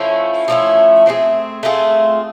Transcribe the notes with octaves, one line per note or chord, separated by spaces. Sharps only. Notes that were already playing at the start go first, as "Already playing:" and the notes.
Already playing: F3 A3 C#4 E4
F3 A3 C#4 E4
A3 C4 F4 G#4
A3 C4 F4 G#4